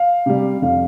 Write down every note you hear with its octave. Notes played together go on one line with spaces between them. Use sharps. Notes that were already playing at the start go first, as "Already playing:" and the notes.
Already playing: F5
C3 G3
F2 F5